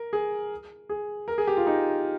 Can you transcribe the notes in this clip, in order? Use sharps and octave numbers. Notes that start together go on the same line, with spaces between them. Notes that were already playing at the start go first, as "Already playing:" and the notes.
Already playing: A#4
G#4
G#4
A#4
G#4
G4
F4
D#4